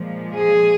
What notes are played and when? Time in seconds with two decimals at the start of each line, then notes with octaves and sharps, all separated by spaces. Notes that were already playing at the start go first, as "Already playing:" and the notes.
Already playing: A#2 F3 G#3
0.34 G#4